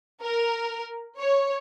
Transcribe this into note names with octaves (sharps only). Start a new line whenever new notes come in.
A#4
C#5